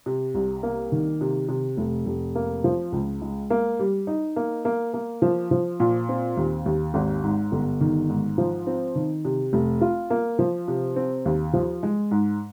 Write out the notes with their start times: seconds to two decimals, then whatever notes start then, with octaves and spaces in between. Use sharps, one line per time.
0.06 C3
0.35 C2
0.63 A#3
0.92 D#3
1.21 C3
1.49 C3
1.77 F1
2.06 F1
2.35 A#3
2.64 F3
2.92 C#2
3.22 G#3
3.50 A#3
3.79 G3
4.07 D#4
4.36 A#3
4.65 A#3
4.94 A#3
5.22 F3
5.51 F3
5.80 A#2
6.09 C4
6.37 D#2
6.66 D#2
6.94 G#1
7.24 G#2
7.52 G1
7.81 D#3
8.09 G#2
8.38 F3
8.67 C4
8.95 D#3
9.25 C3
9.53 F1
9.81 F4
10.10 A#3
10.39 F3
10.68 C3
10.96 C4
11.25 D#2
11.53 F3
11.83 G#3
12.11 G#2